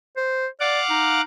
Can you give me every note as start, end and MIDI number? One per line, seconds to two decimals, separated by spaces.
0.17 0.47 72
0.60 0.80 74
0.60 1.21 77
0.60 1.21 78
0.60 1.21 86
0.90 1.22 63